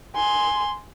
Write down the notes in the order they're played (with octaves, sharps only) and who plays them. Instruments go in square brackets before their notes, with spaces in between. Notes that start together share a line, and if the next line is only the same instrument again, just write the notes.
[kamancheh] G#5 C6